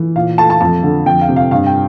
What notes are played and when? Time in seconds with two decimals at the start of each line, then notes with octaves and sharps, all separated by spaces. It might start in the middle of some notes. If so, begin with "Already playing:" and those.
Already playing: E3
0.16 A#2 F5
0.38 A3 A5
0.50 A5
0.61 F2 A5
0.83 D3
1.06 F2 G5
1.21 F5
1.29 C3
1.36 F5
1.51 G2 F5
1.66 G5